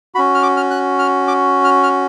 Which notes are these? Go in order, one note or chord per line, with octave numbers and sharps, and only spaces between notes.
C#4 F#4 B5
F6
D6
F6
F#6
F6
D6
F6
F6